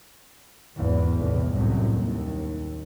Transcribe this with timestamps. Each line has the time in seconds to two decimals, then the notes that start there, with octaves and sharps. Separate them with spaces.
0.76 G#1 E2 G#2
1.19 B1 E2 A2 C3
1.51 C2 F#2 A2
1.91 D#2